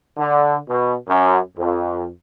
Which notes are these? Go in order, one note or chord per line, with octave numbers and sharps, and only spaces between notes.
D3
B2
F#2
F2